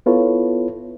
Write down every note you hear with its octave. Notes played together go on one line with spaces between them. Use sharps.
B3 E4 F4 A4 B4 C#5